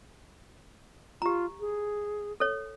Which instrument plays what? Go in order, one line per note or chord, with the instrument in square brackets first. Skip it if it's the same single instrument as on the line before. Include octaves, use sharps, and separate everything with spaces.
[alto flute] F4 [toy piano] G4 A#5
[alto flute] G#4
[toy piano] A4 C#5